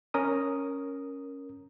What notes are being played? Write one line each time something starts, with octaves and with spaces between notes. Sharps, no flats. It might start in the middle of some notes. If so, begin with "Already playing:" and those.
C#4 A#4 D#6